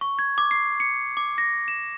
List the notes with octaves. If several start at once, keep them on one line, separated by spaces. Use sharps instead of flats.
C#6
G#6
D6
C7
C#7
D6
A#6
E7